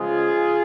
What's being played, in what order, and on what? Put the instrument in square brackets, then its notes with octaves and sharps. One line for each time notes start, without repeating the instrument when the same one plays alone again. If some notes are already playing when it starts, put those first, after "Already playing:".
Already playing: [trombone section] C#3 F3 G#3 F4 G#4